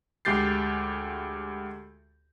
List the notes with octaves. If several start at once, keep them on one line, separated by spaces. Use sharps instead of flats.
D2 G#3 G4 G6 A6 C7